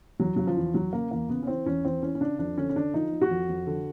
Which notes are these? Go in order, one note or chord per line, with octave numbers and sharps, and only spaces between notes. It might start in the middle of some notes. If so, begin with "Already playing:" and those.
E2 F#3
C#3 F#3
F3
E2
E2 F#3
C#3 A#3
E2 A#3
C#3 B3
C#4
E3 C4
E2 C#4
E2 C4
E3 C#4
C#4
C#3 D4
F2 D4
D3 C#4
C#4
D3 D4
F3 D#4
F3
F#4
F2
F2
D3